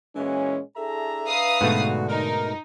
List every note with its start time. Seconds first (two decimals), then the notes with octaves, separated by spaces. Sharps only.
0.16 A#2 E3 G#3 C#4 F#4
0.77 D4 E4 G#4 A4 E5 A#5
1.27 B4 F5 D#6
1.61 G#2 B2 D3 A3 F#4
2.09 D#4 A#4